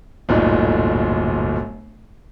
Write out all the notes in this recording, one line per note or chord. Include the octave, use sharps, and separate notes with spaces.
D1 G1 A#2 D#4